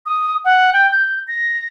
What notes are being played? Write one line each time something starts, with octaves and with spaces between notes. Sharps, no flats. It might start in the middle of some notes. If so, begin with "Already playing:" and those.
D#6
F#5
G5
G6
A#6